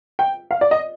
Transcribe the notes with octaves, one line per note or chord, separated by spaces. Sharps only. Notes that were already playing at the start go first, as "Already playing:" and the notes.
G5
F5
D5
D#5